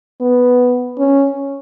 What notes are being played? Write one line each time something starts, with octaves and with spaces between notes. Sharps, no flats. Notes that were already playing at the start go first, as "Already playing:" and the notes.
B3
C#4